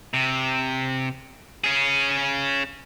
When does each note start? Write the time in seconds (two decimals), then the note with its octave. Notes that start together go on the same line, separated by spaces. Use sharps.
0.14 C3
1.64 C#4 G#4